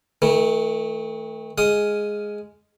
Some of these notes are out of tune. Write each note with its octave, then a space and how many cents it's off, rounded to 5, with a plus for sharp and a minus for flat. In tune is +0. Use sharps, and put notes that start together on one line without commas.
D#3 +45 A3 +0
G#3 +0 F5 +0 D#6 +0